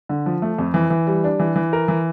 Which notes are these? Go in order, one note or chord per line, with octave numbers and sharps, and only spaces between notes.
D3
F3
A3
F2
E3
E3
G3
D4
E3
E3
A#4
E3